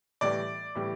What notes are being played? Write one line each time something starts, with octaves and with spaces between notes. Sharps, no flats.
A2 E3 G3 D5
A2 E3 G3